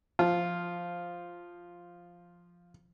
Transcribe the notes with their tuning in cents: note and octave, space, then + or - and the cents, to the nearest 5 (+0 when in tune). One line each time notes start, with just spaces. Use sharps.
F3 +0 F4 +0